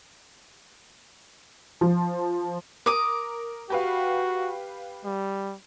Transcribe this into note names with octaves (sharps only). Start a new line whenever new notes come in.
F3
A#4 D6 D#6
F#4 G4 B4 F5
G3